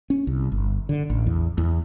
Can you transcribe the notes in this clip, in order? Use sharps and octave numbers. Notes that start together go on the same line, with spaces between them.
C#4
C2
G1
D3
A1
E2
E2